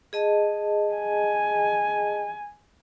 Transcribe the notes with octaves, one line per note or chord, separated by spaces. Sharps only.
G#4 D#5 A5
G#5